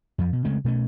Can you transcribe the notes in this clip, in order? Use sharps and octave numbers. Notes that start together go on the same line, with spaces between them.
F2 F3
B2
C#3 G#3 A3 C4
B2 A3 C#4